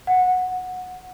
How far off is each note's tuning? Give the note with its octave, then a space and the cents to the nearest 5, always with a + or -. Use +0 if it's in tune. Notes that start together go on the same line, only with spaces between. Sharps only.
F#5 -10